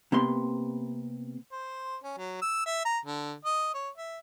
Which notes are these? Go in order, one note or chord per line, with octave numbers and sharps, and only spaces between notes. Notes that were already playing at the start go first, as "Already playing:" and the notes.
C3 A#3 B3 C6
C5
C#4
F#3
E6
E5
A#5
D3
D#5
C#5
E5